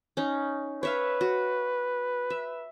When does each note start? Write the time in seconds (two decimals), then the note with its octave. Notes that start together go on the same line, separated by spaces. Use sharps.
0.17 C#4 D#4
0.83 B4 C#5 E5 F5
1.21 F#4
2.30 E5